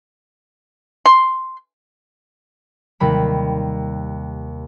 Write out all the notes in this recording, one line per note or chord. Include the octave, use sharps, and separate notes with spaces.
C6
D#2 C3 G3 B5